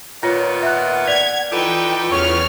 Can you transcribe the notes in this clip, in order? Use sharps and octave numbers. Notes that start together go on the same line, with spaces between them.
A#2 D#3 B3 F4 C#5
E5 F#5 F#6
D5 G#6 B6 F7
E3 D#4 F4 G4 A4 B4 G5
E2 C#3 F#3 B3 C#5 C#6 F6